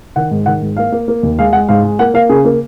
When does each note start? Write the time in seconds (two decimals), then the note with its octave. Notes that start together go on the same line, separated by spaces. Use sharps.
0.16 D#3 F#5
0.31 G#2
0.46 D#3 F#5
0.62 G#2
0.77 A#3 F5
0.92 A#3
1.08 A#3
1.23 D#2
1.39 G#3 F5
1.53 G#3 F#5
1.68 G#2 F5
1.83 G#3
1.99 A#3 F#5
2.14 A#3 F5
2.29 C#3 G#4
2.45 A#3